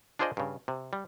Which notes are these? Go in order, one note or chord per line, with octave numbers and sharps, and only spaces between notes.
D4 F4 G#4 C5 D5 D#5
G2 C#3
C3
G3